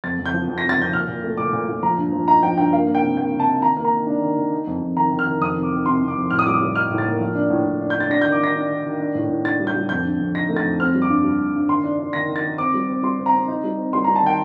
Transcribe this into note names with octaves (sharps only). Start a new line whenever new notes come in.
F2 A6
F2
G6
F3
F2
A#6
C3
A6
F2 G6
A#2 F6
A#2
A3
A#2 D6
A#2
A#2
F3 A#5
G2
F3
D#4 A#5
F3 G5
G2 G5
A#3 F5
A#3
G5
C3
A#3 G5
C3
A5
D#4
D#3 A#5
A#3
A#5
D#3
D4
D#3
D#3
D#4
F2
F2
D#3 A#5
D#3
F6
D#3
F2 D#6
C3
D6
D#3
C3 C6
C3
D6
F2
A2 F6
D#6
G3 D6
D#6
G3
D#4 F6
A2
A6
A#3
F3
D4
A2
A2
D4
G6
D4
A6
D4 A#6
G6
D#3
D6
D#3 A#6
D4
D#3
D#3
D4
A2
A2
D4 A6
G3
G6
G3
F2 G6
D3
F2
D#4 A#6
A3
A6
F2
C4 F6
G3
D6
G2
G3
G2
G2
D#3 C6
D4
D4
D#3 A#6
D#3
A6
D#3
C4 D6
G3
C4
G3 C6
C4
A#5
C4
D#4
G3
C4
G3 C6
A#5
G3
A5
D#3 G5